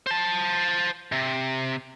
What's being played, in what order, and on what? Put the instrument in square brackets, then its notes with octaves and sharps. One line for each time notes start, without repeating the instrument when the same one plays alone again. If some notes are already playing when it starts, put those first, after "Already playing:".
[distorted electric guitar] C5 A5
C3